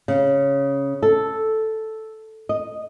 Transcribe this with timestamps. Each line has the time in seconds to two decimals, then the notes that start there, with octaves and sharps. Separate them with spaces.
0.08 C#3
1.03 A4
2.49 D#5